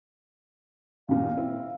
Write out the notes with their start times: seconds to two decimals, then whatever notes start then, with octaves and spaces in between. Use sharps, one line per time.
1.09 D#2 A#2 F5
1.37 C4 E4